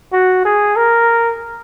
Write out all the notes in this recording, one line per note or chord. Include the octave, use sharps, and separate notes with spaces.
F#4
G#4
A#4